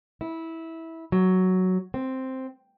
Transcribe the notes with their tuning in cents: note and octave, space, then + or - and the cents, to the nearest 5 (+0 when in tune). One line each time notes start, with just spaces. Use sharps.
E4 -15
F#3 +5
C4 +0